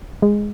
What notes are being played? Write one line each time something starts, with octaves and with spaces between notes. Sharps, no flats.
G#3